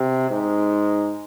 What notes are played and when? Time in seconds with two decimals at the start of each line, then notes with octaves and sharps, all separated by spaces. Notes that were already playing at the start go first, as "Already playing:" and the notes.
Already playing: C3
0.31 G#2